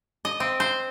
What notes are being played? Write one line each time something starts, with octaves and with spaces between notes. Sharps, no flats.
D#5
C4
C5